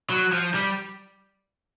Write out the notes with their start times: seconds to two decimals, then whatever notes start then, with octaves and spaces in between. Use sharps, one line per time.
0.10 F#3
0.32 F3
0.54 G3